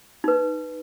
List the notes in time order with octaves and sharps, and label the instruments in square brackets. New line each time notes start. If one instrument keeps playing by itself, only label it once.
[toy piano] D#4 B4